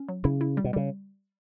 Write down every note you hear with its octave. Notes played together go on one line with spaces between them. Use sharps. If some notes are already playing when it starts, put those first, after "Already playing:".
Already playing: C#4
F#3
C#3 E4
E4
G3
B2
C#3 G3